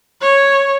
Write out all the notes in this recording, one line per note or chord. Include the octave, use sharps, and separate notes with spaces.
C#5